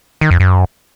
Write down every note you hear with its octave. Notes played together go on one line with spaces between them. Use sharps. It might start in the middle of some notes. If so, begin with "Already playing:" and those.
D#3
F2
F#2